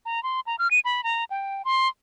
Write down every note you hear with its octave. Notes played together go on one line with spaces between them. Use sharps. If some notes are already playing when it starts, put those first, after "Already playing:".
A#5
C6
A#5
F6
D#7
B5
A#5
G5
C6